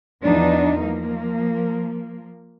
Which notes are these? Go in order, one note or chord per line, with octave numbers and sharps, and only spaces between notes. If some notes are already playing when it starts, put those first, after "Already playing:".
E2 F3 D4 D#4
F3 A#3